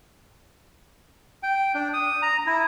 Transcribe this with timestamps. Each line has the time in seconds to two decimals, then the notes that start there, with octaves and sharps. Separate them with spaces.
1.43 G5
1.74 D4
1.93 D#6
2.22 A#5
2.47 E4